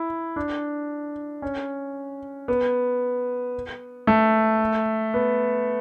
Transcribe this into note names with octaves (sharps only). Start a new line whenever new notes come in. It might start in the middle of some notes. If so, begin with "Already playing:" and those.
Already playing: E4
D4
C#4
B3
A3
B3